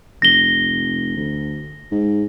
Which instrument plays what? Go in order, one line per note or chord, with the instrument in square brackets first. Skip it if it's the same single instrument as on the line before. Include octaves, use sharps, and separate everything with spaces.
[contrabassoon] F1 [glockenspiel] A#6 G7
[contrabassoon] D2
G#2